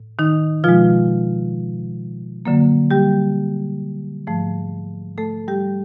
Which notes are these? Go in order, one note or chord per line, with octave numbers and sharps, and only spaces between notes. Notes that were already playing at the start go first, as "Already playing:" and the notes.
Already playing: A2
D#3 D#4
B2 F3 G#3 F4
F#2 D3 F#3 A#3
G3 G4
G#2 F3 A3
A3 A4
G3 G4